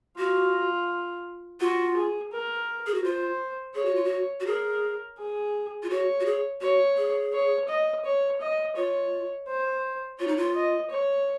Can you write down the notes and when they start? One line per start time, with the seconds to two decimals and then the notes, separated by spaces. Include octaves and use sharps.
0.18 F4 F#4
1.60 F4 F#4
1.96 G#4
2.32 A#4
2.87 G#4
2.94 F#4
3.04 F4 C5
3.75 G#4 C#5
3.85 F#4
3.95 F4
4.04 F#4
4.40 F#4
4.47 G#4 A#4
5.19 G#4
5.83 F4
5.90 F#4 C#5
6.20 F#4
6.26 G#4
6.61 F#4 C#5
6.98 G#4
7.33 C#5
7.69 D#5
8.05 C#5
8.41 D#5
8.76 F4 C#5
9.48 C5
10.19 F4 C#5
10.27 D#4
10.37 F4
10.55 D#5
10.91 C#5